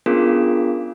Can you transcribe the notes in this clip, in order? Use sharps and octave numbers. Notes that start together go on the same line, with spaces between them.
B3 C#4 D4 F4 G#4 A#4